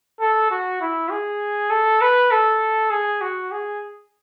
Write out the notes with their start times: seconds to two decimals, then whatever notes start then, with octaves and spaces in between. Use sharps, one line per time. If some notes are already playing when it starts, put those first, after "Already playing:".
0.20 A4
0.51 F#4
0.81 E4
1.11 G#4
1.70 A4
2.01 B4
2.31 A4
2.90 G#4
3.21 F#4
3.51 G#4